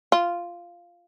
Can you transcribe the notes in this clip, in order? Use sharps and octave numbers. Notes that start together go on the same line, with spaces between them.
F4